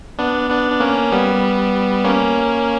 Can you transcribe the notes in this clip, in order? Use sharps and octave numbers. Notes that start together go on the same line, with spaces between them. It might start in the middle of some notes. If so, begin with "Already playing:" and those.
B3 D4
B3 D4
D4
A#3 C#4
G3 B3
A#3 C#4